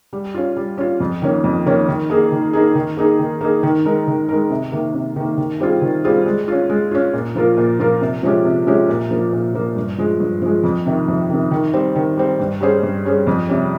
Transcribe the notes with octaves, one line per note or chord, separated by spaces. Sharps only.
G3
C#4 F4
G3
C#4 F4
F2
D#3 A#3 C#4
F2
D#3 A#3 C#4
D#3
A#3 D#4 G#4
D#3
A#3 D#4 G#4
D#3
A#3 D#4 G#4
D#3
A#3 D#4 G#4
D#3
G#3 D#4 A#4
D#3
G#3 D#4 A#4
C3
D#3 A#3
C3
D#3 A#3
D#3
G3 C4 F4 G#4
D#3
G3 C4 F4 G#4
G#3
C#4 F4
G#3
C#4 F4
A#2
F3 A#3 F4 A#4
A#2
F3 A#3 F4 A#4
C3
F3 G#3 C#4 G4
C3
F3 G#3 C#4 G4
A#2
F3 A#3
A#2
F3 A#3
G2
F3 G#3
G2
F3 G#3
F2
C3 D#3
F2
C3 D#3
D#3
G3 C4
D#3
G3 C4
G2
G3 C#4 G#4 C5
G2
G3 C#4 G#4 C5
F2
C3 G3 C#4